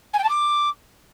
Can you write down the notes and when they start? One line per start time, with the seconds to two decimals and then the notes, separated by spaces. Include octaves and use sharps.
0.13 G#5
0.18 G5
0.23 A5
0.28 D6